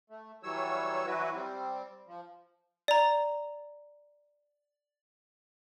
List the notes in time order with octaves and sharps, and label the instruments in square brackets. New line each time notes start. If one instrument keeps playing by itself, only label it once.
[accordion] A3
E3 F#3 G3 C#5 E6
E3 F#3 E4 F#4 B4
G3 C4
F3
[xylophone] D5 A#5